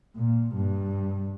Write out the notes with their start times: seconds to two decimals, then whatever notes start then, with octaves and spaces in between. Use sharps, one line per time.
0.17 A#2
0.55 G2